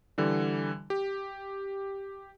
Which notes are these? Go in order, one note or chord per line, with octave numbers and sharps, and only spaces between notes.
D3 E3 G3
G4